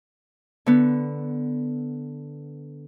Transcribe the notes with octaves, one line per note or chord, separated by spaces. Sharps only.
D3 B3